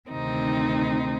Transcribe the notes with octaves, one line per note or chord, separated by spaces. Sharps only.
D2 C3 D#3 C4 D#4